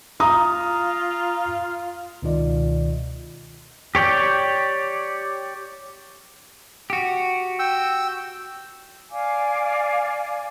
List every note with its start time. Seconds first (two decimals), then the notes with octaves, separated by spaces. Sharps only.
0.20 F4 A#5 D#6
2.22 C#2 B2 D#3 F4 D5 D#5
3.95 G4 C#5 D5 G5
6.90 F#4 G4
7.59 G5 E6
9.11 D5 F5 G#5 D6